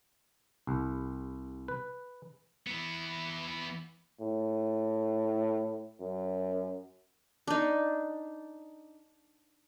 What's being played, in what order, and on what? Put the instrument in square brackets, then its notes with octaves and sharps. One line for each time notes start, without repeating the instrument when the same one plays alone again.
[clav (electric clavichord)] C2
B4
[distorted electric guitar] E3 B3
[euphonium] A2
F#2
[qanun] D4 D#4